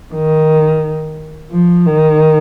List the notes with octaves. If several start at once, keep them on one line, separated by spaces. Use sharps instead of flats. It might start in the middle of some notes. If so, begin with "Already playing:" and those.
D#3
F3
D#3